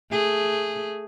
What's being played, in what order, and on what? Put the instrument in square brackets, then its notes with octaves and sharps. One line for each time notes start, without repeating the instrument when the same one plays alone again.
[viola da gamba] A3 G#4